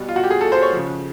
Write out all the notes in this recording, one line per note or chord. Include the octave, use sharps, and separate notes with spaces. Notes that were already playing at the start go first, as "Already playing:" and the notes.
Already playing: B2 G3
F4
F#4
G4
G#4
A4
C5
C#5
C#3 F3